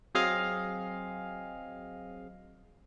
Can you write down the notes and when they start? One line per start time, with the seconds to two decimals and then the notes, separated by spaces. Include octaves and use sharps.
0.15 F#3 C4 G#4 D#5 F5